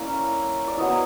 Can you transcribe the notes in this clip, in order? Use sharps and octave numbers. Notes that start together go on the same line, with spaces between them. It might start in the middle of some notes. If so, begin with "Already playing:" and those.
Already playing: A#3 C#4 E4 D5
D5
F#3 B3 E4 D#5